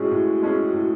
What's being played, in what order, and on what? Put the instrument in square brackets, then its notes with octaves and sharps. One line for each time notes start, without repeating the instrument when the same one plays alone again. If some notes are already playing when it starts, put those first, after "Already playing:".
Already playing: [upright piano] A2 G#3 C#4 G#4 [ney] F#4
[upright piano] A2
G#3 C#4 G#4
A2